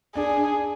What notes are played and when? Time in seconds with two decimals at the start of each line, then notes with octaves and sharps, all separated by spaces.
0.16 D4 G#4
0.37 D4